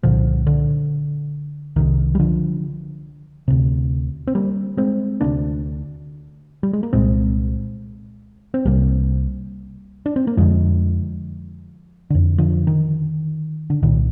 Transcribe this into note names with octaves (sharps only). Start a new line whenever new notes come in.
C2 A#2 D3 F3
D3
C2 C3 D#3
G3
D3 F3
D2 C3
C4
G3 A#3
G#3 C4
D2 C3 A#3 D4
G3
G#3
A#3
C2 A#2 G#3 C4
C4
C2 C3 G3 A#3
D4
C4
A#3
F2 D3 F3 G#3
F2 D3
D3 F3
D#3
D3
C2 A#2 D#3